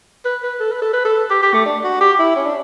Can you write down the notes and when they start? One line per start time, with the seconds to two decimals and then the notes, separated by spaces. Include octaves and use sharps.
0.25 B4
0.43 B4
0.60 A4
0.71 B4
0.82 A4
0.93 B4
1.05 A4
1.30 G4
1.43 G4
1.54 A3
1.66 D4
1.84 F#4
2.01 G4
2.19 E4
2.36 C#4
2.46 D4